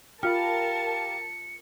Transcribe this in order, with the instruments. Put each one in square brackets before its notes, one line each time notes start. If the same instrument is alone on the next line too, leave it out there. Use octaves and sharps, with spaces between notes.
[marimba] F4 F6 [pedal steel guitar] G4 F5 B5 [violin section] A#4 A5 [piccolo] C#7